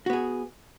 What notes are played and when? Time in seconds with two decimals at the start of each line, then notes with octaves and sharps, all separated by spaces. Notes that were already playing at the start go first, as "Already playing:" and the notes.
0.06 F#4
0.10 B3
0.13 G#4